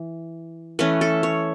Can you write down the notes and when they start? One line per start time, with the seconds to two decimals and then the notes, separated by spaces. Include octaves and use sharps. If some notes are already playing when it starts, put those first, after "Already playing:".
Already playing: E3
0.79 E3 A3 C#4 B4
1.01 A4
1.23 C#5